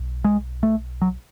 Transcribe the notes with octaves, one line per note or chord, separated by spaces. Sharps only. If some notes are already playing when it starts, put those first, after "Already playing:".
Already playing: B1
G#3
A3
F#3